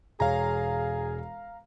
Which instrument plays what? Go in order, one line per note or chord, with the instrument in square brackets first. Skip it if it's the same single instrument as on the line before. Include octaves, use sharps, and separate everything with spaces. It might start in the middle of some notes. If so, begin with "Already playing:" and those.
[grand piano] E1 C#5 [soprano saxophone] G#4 [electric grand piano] F5 A#5